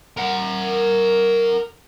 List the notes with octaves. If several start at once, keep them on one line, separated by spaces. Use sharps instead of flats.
A#4 F#5